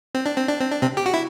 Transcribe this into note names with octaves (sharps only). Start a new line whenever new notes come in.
C4
D4
C4
D4
C4
D4
C3 C4
G4
F#4
E4